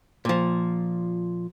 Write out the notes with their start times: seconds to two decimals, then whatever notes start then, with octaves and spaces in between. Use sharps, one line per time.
0.25 A#2 F3